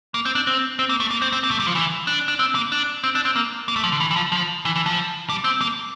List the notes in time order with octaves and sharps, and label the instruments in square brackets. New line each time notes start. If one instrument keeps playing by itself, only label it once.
[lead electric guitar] A#3
C4
D4
C4
C4
A#3
A3
A#3
C4
C4
A#3
A3
G3
F3
E3
D4
D4
C4
A#3
D4
C4
D4
C4
A#3
A#3
A3
F3
D3
E3
E3
F3
F3
E3
E3
F3
G3
C4
A#3